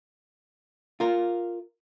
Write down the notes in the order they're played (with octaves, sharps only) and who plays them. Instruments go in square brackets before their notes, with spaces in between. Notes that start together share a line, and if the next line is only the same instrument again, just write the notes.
[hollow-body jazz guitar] F4 A#4